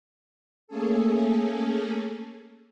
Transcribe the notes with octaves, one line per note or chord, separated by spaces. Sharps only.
A3 A#3 C#4 G#4 A4